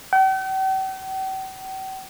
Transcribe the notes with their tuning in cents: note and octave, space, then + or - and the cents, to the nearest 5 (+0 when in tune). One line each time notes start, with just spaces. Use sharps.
G5 -45